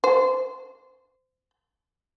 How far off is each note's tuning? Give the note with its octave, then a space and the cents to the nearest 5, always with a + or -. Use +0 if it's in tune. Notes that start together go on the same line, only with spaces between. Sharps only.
C5 -25